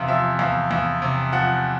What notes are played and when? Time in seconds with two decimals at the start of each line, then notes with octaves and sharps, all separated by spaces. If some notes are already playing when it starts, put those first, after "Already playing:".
Already playing: E2 C3 F5
0.08 F3 E5
0.39 E2 F5
0.71 E2
1.02 C3
1.32 F3 F#5